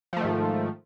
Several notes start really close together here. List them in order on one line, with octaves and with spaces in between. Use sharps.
F3 A3 D#3 G#2